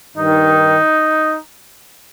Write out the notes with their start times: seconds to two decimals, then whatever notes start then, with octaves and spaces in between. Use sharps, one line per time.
0.15 G2 D#3 D#4